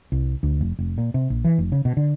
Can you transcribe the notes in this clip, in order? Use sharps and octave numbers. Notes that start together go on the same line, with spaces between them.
C2
D2
F1
F1
A#2
C3
A#1
E3
F1
C#3
B2
D3